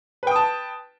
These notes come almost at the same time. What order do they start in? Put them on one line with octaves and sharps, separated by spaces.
B4 G5 D#6 A5